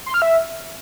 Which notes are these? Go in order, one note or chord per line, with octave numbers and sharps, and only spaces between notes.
C6
F6
E5